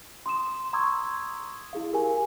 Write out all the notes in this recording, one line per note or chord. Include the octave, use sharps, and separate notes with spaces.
C6 D#6 E7
A#5 C6 C#6 D#6 E6 G#6
E4 G#4 F5
G4 A#4 G#5